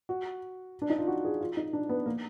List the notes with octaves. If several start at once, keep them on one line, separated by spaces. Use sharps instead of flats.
F#4
D4
D#4
F4
F#4
G#4
F4
D#4
D4
B3
A#3